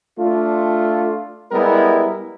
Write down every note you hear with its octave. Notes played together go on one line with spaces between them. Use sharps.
A3 D4 F4
G3 G#3 B3 E4 A#4